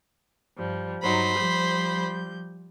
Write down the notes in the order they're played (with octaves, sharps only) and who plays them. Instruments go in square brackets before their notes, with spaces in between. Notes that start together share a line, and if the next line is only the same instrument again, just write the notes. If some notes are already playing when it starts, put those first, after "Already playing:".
[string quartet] G2 F3 G3
[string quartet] G2 F#3 D#4 [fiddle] C5 B5
[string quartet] F3 G3 G6